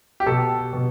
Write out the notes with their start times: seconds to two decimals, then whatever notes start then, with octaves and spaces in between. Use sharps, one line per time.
0.20 G4
0.26 B2 A4
0.73 B2